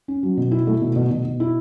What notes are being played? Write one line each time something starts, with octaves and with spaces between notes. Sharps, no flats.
C#4
F#3
B2
E4
A3
B2
B2
B2
B2
E4